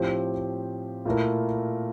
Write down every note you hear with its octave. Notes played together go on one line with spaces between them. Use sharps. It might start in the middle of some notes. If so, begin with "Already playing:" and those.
Already playing: A2 F3 C4 G4
A#2 A3 E4 A#4